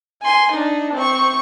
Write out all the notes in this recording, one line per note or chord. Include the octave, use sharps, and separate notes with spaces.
G#5 C6
D4 D#4
C4 C#6